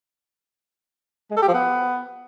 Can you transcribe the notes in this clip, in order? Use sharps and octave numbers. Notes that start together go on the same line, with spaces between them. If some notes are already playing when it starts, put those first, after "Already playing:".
G#3
A4
G4
F3
B3